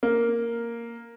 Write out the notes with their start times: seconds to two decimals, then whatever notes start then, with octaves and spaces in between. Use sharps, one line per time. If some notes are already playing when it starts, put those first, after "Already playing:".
0.03 A#3